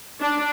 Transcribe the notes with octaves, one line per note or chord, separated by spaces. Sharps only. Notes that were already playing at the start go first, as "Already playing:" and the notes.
D4